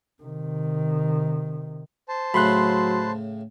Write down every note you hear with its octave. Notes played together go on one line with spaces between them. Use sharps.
C3 D#3
C5 A5
A2 C#3 F#3 B5 C6 F#6